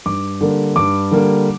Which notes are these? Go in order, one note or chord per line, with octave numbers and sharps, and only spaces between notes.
G2 D6
D3 G3 A#3
G2 D6
D3 G3 A#3